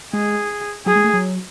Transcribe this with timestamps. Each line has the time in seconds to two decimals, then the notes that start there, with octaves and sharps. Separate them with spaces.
0.13 G#3 G#4
0.86 F#3 G#4
0.95 G#3
1.04 A3
1.13 F#3